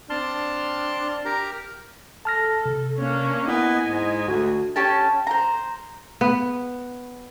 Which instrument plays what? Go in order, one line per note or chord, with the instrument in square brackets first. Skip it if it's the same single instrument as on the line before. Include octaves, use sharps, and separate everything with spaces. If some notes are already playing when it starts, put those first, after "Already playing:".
[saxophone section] C4 D4 [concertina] A5 C6 F6
[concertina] G4 A#4 A#5
[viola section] A4 [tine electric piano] A5 F6 A#6
[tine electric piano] C3
[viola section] A#3 C#4 D4
[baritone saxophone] B3 [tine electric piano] E4 [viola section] D#5 G#5
[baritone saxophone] G#2
[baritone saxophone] D2 [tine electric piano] F#4
[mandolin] C#4 G4 A5
C5 A#5
[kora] B3